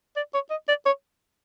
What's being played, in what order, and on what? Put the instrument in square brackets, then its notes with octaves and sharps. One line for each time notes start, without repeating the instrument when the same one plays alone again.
[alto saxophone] D5
C#5
D#5
D5
C#5